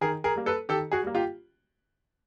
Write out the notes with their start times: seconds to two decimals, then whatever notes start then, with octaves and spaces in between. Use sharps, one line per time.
0.01 D#3 G#4 A#4
0.24 G#4 A#4
0.36 G3 A#3
0.46 A4 B4
0.69 D#3 G4 A4
0.92 F#4 G#4
1.03 G3 A#3
1.15 F4 G4